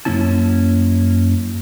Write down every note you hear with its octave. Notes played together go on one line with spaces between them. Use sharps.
F#2 C3 A#3 C#4 E4 A5